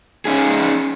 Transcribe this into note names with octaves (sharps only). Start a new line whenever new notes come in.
C#4 D#4 G#4